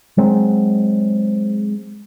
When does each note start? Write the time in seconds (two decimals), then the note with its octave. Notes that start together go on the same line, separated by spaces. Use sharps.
0.17 F#3 G#3 C4